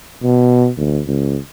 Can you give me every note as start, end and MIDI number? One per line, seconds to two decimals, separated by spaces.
0.23 0.70 47
0.77 1.02 38
1.07 1.39 37